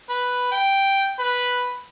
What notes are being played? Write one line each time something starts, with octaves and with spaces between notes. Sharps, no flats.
B4
G5
B4